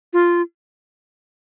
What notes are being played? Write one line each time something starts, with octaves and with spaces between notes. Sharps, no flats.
F4